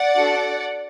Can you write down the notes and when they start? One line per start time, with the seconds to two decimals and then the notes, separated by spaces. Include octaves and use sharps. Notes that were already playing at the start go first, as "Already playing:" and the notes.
Already playing: D5 F#5
0.15 D4 F#4 A4